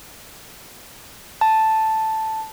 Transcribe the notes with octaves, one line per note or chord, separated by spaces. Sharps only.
A5